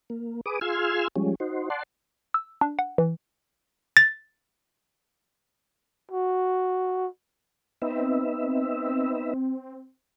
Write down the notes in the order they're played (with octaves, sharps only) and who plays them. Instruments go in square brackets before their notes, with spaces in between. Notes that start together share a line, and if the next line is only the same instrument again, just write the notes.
[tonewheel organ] A#3
G#4 B4 D6 D#6
F4 G#4 C6 E6 F6 G#6
F3 G3 G#3 C#4
D#4 F#4 C5
D5 F#5 A5 C6
[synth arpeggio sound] E6
D4
F#5
E3
[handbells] A6
[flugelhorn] F#4
[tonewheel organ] B3 D#4 E5 [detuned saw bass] C4